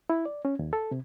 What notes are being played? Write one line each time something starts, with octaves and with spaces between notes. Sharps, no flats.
E4
D5
C#4
D#2
A4
C3